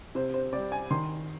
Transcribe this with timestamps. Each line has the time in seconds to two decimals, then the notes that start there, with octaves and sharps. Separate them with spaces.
0.15 C3 C5
0.34 C5
0.53 G3 C4 D5
0.72 G#5
0.91 D#3 C6